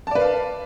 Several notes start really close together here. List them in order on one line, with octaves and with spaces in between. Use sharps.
A5 D5 B4 F5